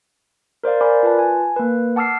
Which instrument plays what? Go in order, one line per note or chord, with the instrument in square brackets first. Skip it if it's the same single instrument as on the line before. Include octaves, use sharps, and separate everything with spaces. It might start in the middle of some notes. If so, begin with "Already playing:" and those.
[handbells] A#4 C5 D5 F5
A#4 D5 G#5 B5 D6
F4 B4 A5
G#5
A#3 B4
F#5 A5 D6 E6 F6 C7